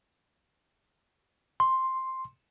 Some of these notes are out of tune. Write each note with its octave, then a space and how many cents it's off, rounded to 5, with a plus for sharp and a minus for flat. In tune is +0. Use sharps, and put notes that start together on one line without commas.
C6 +5